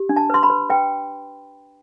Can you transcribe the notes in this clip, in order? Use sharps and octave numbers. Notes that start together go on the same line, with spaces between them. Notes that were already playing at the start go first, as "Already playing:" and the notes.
Already playing: G4
D4
A5
B4 C6
B5
B4
B4 G5